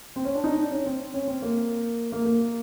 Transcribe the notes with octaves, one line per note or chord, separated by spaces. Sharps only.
C4
C#4
D4
D#4
D4
C#4
C4
C#4
C4
A#3
A#3
A#3